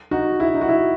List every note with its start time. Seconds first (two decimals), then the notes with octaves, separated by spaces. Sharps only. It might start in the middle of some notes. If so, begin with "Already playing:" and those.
0.11 D#4 F#4
0.40 E4
0.54 D#4
0.61 F#4
0.69 E4